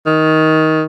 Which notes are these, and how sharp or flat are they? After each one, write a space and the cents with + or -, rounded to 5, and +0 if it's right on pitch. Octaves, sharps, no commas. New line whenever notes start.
D#3 +15